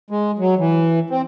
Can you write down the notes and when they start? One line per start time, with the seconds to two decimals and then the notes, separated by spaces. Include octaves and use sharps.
0.10 G#3
0.38 F#3
0.59 E3
1.10 C4